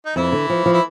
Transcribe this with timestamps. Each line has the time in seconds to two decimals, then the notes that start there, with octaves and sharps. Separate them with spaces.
0.05 D#4
0.16 F2 E3 E4
0.32 D3
0.50 F3
0.66 F3
0.73 E4